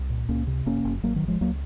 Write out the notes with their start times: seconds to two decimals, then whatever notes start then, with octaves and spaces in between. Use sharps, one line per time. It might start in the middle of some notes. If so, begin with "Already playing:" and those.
Already playing: C2
0.10 A#2
0.29 C#2 A#3 C#4
0.47 C3
0.66 F#1 A#3 C#4
0.85 F#1
1.03 G#1 F#3 A#3
1.16 D#3 F#3
1.22 G#1
1.28 F3 G#3
1.41 C#2 F#3 A#3